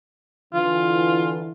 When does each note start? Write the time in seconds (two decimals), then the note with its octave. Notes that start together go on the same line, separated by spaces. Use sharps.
0.54 D3 E3 F4